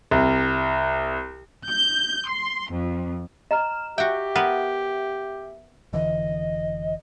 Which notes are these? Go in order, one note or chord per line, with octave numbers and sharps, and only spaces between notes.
C2
G6
C6
F2
D#5 A#5 F6 E7
F#4 G4 E5 G5
B3 A#4 B4 F#5
F1 D3 E3 D#5